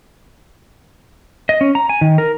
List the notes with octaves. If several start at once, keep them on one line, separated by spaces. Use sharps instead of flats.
D#5
C#4
A#5
G#5
D#3
A#4